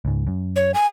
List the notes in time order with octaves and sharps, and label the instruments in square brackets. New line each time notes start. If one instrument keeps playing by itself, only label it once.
[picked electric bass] C#2 G#2
F#2
[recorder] C#5
G#5